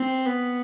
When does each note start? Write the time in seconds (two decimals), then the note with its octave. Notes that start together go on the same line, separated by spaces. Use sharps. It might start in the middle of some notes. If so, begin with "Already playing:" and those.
Already playing: C4
0.26 B3